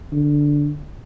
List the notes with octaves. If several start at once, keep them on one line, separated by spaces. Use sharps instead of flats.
D3